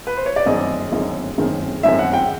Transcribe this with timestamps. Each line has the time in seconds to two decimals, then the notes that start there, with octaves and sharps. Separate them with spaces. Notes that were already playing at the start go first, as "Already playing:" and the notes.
0.07 B4
0.17 C5
0.26 C#5
0.36 D5
0.46 G1 F#2 D#3 G#3 C4 D#5
0.92 G1 F#2 D#3 G#3 C4
1.38 G1 F#2 D#3 G#3 C4
1.83 G1 F#2 D#3 G#3 C4 E5
1.99 F#5
2.14 G5